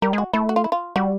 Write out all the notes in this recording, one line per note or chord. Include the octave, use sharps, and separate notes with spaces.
G3 A#4
G#3 F#4
A3 E4
F#4
F4
E4
F4
G3 F#4